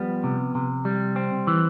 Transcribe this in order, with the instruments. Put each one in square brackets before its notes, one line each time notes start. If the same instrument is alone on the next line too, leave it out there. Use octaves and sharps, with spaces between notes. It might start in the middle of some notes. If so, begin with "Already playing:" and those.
Already playing: [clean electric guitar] F3 G3 B3
C3
C3
G3
C4
E3